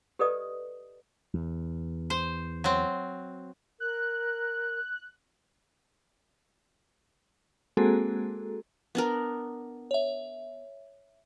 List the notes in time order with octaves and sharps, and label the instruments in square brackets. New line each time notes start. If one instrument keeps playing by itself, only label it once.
[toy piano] G4 A4 B4 D5 D#5 D#6
[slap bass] E2
[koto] C5
F#3 C4
[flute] A#4 [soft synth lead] F#6
[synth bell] G#3 A#3 C4 F#4 G#4 A4
[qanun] B3 D4 A#4
[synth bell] C#5 E5